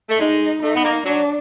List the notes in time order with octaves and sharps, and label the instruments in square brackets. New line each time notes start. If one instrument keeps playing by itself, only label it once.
[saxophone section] A3
[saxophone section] G#3 [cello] D#4
[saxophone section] A3 [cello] D#4
[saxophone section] B3
A#3
[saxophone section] F#3 [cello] D4